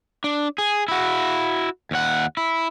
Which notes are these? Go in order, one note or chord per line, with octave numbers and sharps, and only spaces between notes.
D4
G#4
E4 F#4
D#2 F#5
E4